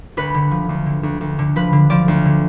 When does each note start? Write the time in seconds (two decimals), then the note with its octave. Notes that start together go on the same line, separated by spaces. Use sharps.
0.17 D2 B4
0.34 D3
0.51 F3
0.69 D2
0.86 D3
1.03 D2
1.21 D2
1.39 D3
1.56 F3 B4
1.73 D3
1.90 F3 D5
2.08 D2
2.25 D3